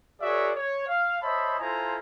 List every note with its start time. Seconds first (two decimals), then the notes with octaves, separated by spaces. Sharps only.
0.21 F#4 G#4 A#4 C#5 D5 E5
0.55 C#5
0.87 F5
1.22 C5 C#5 D#5 E5 A5 B5
1.59 E4 F4 A4 C5 G#5 A#5